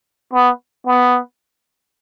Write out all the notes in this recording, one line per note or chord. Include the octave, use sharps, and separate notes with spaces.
B3
B3